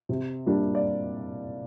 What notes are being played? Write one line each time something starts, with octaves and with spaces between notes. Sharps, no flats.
C3
G3 A#3 D4
D5